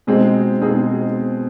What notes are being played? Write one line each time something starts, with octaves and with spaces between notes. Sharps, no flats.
B2 G#3 C4 D#4 G#4
B2 G#3 C4 D#4 G#4